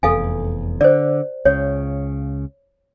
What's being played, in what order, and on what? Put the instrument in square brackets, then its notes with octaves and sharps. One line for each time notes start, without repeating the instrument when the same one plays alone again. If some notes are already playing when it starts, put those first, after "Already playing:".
[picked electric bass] F1 E2 [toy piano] A4 F5 G#5
[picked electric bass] D3 [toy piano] C5 D5
[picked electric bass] C#2 C#3 [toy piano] C#5